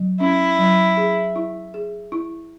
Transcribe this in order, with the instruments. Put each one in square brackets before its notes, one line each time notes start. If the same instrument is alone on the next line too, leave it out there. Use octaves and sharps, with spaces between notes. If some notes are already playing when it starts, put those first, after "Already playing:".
Already playing: [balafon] F#3
[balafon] C#4 [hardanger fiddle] E4
[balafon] F#3
G#4
E4
G#4
E4